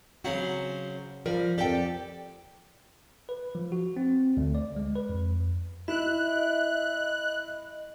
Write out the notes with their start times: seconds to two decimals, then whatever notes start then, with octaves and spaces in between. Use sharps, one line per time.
0.24 C#3 F#3 C4 F#4
1.26 F3 G3 A#4
1.58 F2 G4 A4 D5 G5
3.29 B4
3.55 F3
3.72 F#4
3.97 C4
4.37 D2
4.55 D5
4.76 G#3
4.95 B4
5.09 F2
5.88 E4 D#5 E5 F#6